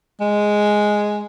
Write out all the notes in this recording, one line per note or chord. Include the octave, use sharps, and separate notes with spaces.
G#3